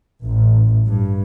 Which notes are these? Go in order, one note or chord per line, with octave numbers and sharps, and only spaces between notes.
A1
G2